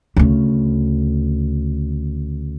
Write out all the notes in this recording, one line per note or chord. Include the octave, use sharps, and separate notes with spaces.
D2 C#3